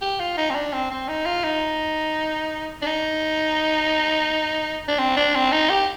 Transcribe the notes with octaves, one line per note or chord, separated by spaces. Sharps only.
G4
F4
D#4
C4
D4
C4
C4
D#4
F4
D#4
D4
D#4
D4
C4
D4
C4
D#4
G4